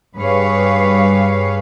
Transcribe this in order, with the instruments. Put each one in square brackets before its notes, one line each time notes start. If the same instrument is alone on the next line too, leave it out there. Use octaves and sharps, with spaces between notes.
[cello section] G2 G#4 B4 C#5 F5